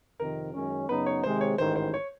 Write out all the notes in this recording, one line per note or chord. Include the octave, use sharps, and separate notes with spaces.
F2 C3 D#3 A#4
F#2 D#3 G#3 C#4
F#2 C#3 F#3 B3 D#4 B4
C#5
C3 D#3 G#3 C5
C#5
A1 G#2 D#3 C5
C5
C#5